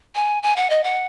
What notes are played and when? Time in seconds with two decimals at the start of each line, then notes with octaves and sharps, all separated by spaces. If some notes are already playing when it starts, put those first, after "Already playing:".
0.15 G#5
0.43 G#5
0.56 F#5
0.70 D#5
0.84 F#5